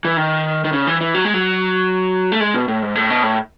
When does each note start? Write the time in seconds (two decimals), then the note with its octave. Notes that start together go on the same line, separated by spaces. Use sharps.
0.05 E3
0.17 D#3
0.64 D#3
0.73 C#3
0.87 E3
1.01 E3
1.15 F#3
1.25 G#3
1.34 F#3
2.32 A3
2.40 G#3
2.54 B2
2.68 A2
2.82 G#2
2.95 A2
3.10 B2
3.23 A2